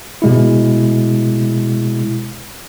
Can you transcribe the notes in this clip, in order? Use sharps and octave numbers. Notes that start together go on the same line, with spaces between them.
B2 G#3 E4